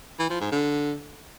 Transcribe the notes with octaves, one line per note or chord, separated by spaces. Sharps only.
E3
F3
G#2
D3